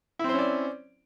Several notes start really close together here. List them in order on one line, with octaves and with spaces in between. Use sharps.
E4 C4 C5 C#4 D5